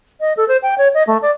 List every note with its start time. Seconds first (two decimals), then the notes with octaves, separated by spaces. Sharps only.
0.21 D#5
0.37 A4
0.48 C5
0.63 G5
0.78 C#5
0.94 D#5
1.07 A3
1.22 D5